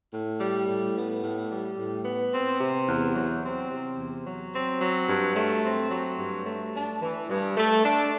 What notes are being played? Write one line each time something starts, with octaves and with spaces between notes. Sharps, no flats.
A2
G3
A2
B3
A2
G3
A2
B3
C4
C3
E2
F#3
C4
C3
E2
F#3
C4
F#3
G2
A3
C4
F#3
G2
A3
D4
E3
G2
A3
D4